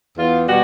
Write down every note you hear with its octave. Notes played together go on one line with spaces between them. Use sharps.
E2 F4
B2 G3 F#4